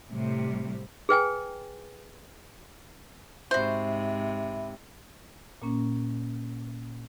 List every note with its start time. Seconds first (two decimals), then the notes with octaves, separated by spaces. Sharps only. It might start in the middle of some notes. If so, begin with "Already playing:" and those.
0.11 A2 C3 G3
1.09 G#4 B4 G5 G#5
3.51 G#2 C3 F#4 C5 E5 B5
5.62 A#2 A#3 C#4